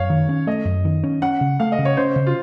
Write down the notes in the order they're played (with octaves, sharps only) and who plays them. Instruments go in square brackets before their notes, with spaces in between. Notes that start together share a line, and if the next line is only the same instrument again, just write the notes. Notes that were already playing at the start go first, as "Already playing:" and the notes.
Already playing: [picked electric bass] F#2 [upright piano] C#5 F5
[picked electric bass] D#3
C#4
[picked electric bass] A3 [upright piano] D#5
[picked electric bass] F#2
D#3
C#4
[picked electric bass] C#4 [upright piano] F#5
[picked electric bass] C#3
[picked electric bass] A3 [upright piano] F5
[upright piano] D#5
[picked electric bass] C#3
[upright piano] C#5
[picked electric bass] C#4 [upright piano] C5
[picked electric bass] C#3
[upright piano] F4